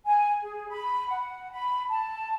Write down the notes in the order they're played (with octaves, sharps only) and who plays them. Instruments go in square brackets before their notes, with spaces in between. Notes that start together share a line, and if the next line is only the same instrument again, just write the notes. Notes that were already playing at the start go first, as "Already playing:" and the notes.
[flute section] G#5
G#4
B5
F#5
B5
A5